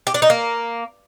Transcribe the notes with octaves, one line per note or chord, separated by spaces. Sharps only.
G4
D4
D#4
A#3